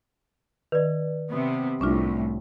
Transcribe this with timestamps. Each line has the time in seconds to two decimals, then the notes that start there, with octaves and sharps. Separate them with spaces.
0.72 D#3 B4 D5
1.32 C3 B3
1.81 C2 A2 C#4 D4 F4